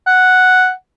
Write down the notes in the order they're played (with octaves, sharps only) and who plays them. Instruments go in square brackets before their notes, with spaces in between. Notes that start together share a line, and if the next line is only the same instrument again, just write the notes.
[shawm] F#5